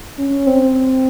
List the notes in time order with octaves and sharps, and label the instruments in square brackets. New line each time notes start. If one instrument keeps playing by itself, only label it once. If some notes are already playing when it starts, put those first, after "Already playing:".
[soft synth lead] C#4
C4